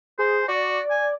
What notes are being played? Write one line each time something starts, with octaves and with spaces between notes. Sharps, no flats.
G#4 C5
F#4 D5
G#5